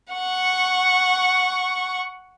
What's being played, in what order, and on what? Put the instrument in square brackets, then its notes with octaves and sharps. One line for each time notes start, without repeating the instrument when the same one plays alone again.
[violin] F#5 C#6